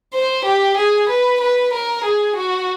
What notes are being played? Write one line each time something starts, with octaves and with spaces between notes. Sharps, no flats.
C5
G4
G#4
B4
B4
A#4
G#4
F#4